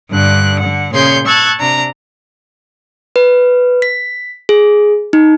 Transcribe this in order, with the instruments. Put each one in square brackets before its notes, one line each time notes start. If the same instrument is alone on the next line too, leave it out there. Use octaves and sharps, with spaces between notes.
[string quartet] G2 D3 F#6
D3 F#5
A#2 C#3 G#4 C#5 C6 G6
A5 C#6 E6 F#6 G#6
C3 D4 A#5
[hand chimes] B4
B6
G#4
D#4